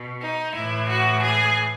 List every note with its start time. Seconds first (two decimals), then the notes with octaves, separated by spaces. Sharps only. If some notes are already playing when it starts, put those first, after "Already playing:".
Already playing: B2
0.21 D#4
0.55 A2 E3 E4
0.90 F#4
1.24 G#4